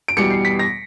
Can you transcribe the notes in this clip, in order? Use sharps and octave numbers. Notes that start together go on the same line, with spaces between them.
D7
E2 B2 G3 C#7
C7
B6
A#6